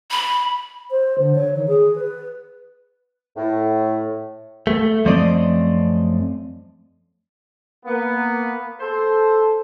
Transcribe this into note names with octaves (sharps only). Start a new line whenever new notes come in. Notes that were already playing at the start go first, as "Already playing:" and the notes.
B5
C5
D3
C#5
D#3
G#4
B4
A2
A3
F#2 F3 A3 C4 D5 D#5
A#3 B3
A4 C5